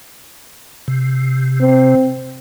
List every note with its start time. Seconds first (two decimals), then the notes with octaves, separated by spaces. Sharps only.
0.88 C3
1.61 C4